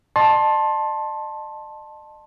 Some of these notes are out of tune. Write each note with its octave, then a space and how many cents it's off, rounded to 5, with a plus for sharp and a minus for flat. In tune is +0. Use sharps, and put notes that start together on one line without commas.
D#5 -40 A5 +0 C6 +25